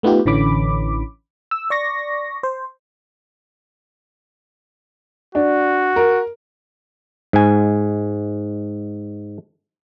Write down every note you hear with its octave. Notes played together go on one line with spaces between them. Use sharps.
A3 B3 D#4 F4 G4
A1 D3 E3 C#4 B5 D6
E6
D5 C#6 A#6
C5
D4 F#4
A#4
G#2 G#5